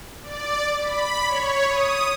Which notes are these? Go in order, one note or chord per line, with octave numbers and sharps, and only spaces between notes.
D5
B5
C#5
D#6